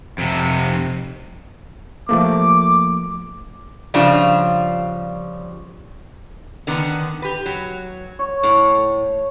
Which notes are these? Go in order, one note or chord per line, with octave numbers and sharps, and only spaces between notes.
F2 C3
F3 A3 A#3 D6
C#3 F3 G3 D4 F4
D3 D#3 B3
G4 B4
F#3
C#5
A2